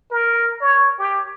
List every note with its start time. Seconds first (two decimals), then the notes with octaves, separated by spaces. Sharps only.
0.11 A#4
0.60 C#5
0.99 G4